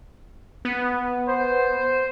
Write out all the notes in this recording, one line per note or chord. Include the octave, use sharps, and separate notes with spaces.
B3
C5